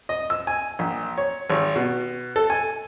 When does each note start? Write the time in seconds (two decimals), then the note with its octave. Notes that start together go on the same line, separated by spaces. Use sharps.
0.09 D#5
0.30 E6
0.47 G#5
0.79 A#1
1.18 C#5
1.50 G#1
1.76 B2
2.36 A4
2.50 G#5